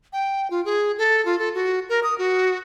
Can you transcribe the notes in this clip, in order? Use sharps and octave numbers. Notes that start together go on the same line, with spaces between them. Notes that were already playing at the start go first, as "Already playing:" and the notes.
G5
F4
G#4
A4
F4
A4
F#4
A#4
D#6
F#4